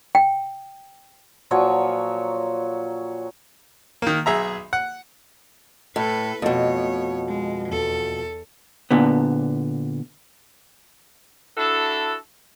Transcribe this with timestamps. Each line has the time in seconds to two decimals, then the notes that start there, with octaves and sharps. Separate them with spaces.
0.15 G5
1.51 A#2 F3 F#3 C#5
4.02 D#3 A#3
4.26 B1 G#4 E5 A#5
4.73 F#5
5.96 A2 A4 B4
6.42 F2 B2 A3 C#5
7.28 G#3
7.69 E2 A4
8.91 A#2 D3 B3
11.57 D4 E4 F#4 A4